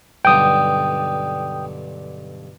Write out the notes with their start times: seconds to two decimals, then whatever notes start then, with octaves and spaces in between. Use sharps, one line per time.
0.25 B1 G2 D3 G5 D#6